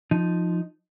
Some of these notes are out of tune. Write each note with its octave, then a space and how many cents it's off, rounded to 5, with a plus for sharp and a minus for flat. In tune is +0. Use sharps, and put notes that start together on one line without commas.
F3 +0 D#4 +0